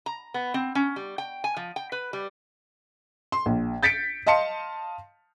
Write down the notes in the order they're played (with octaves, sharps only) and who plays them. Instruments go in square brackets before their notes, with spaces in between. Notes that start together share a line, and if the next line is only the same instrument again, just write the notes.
[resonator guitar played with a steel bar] A#5
B3
C4
C#4
G3
G5
G#5
F3
G5
B4
G3
[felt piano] C6
A#1
G6 A6 B6 C#7 D7
D#5 F5 A5 C6 C#7